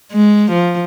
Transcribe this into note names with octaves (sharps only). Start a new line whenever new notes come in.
G#3
F3